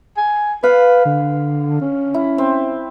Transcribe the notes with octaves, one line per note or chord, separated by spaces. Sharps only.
G#5
B4 F5
D3
C#4
E4
C4